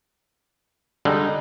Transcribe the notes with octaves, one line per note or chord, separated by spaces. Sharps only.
D3 G3 G#3 D#4